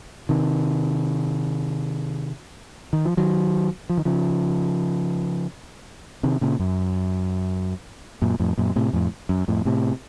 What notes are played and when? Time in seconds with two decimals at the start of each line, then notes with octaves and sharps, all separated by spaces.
0.29 C3 D#3
2.93 D#3
3.05 F3
3.17 D#3 F#3
3.90 F3
3.98 D#3
4.05 C#3 F3
6.23 C3 D#3
6.41 A#2 C#3
6.59 F#2
8.22 F#2 A#2
8.40 F2 A2
8.58 F#2 A#2
8.76 A2 C3
8.93 F2 A2
9.29 F#2
9.48 F2 A2
9.65 A2 C3